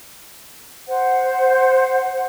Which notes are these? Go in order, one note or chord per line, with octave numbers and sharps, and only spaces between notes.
C5 F#5